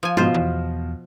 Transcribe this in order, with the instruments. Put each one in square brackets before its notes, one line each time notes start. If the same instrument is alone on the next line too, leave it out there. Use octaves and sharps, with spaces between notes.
[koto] F3 G#5
[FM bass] G#2 [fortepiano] B2 F3 [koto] F4 C5
[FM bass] E2